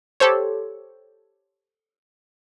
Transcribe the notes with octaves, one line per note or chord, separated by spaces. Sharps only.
G4 A4 C5 C#5